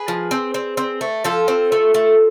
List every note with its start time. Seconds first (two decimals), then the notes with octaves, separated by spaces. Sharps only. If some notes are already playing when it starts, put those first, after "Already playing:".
Already playing: G#4 B4
0.08 F3
0.31 C4
0.54 C4
0.77 C4
1.01 A3
1.24 F3 F4 A4
1.48 C4
1.72 A3
1.94 A3